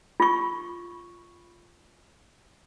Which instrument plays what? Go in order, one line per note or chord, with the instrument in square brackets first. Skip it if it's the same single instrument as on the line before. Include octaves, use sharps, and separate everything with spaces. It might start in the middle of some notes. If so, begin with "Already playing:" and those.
[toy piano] F4 C#6